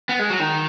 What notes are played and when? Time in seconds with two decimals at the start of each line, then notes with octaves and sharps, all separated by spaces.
0.09 B3
0.19 G#3
0.30 F#3
0.40 D#3